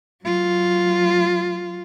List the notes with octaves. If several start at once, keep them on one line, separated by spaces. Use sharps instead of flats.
F#3 F4